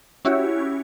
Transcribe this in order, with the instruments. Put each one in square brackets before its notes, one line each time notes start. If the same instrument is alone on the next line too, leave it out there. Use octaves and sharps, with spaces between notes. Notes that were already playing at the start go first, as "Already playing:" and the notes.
[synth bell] C#4 E4 F#4 G4 C#5